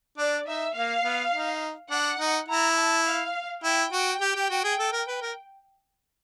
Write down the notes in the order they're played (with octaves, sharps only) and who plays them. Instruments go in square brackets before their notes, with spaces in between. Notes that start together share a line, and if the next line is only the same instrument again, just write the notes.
[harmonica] D4 [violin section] D5
[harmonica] D#4 [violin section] E5
[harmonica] A#3 [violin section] F5
[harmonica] B3
D#4
[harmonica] D4 [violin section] F#5
[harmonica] D#4
[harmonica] E4 [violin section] A#5
[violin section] A5
F5
[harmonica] E4 [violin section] G5
[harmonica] F#4
G4
G4
F#4
G#4
A4
A#4
B4
A#4